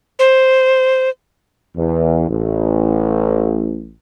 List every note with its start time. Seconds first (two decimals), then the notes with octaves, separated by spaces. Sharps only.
0.19 C5
1.76 E2
2.28 A1